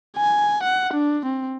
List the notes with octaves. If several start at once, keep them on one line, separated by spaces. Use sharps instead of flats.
G#5
F#5
D4
C4